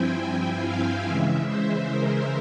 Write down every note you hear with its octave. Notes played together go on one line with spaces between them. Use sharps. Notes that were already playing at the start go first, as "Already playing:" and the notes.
Already playing: G2 F3 C4 E4 G5 G#5
F5
C#3 E3 G#3 E5
C5
A#4